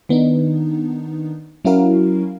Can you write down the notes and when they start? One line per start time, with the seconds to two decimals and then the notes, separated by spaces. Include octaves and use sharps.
0.09 D#3 B3 D4 D#4
1.65 F#3 C#4 E4 F#4 A#4 F5